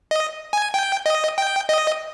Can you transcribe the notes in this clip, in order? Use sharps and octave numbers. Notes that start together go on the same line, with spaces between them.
D#5
G#5
G5
D#5
G5
D#5